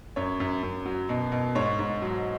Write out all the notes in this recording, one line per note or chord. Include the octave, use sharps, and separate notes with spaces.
F#2 C#5
F#2
F#2
F#3
B2
B2
G#2 C#5
G#2
F#3